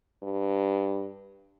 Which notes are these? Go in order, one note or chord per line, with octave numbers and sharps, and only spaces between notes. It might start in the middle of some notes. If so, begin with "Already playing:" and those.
G2